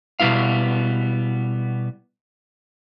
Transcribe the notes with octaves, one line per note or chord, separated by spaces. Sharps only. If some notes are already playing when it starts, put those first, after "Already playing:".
B2 G3 B3 E4 F5